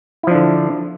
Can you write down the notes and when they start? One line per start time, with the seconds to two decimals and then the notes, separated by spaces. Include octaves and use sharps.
0.23 E4
0.27 F3
0.31 D4
0.35 D3